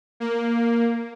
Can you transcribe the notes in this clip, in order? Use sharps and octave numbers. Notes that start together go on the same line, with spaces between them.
A#3